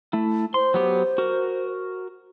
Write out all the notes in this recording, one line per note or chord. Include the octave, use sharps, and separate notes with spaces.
A3 E4
C5 C6
F#3 B3 G4
F#4 A#4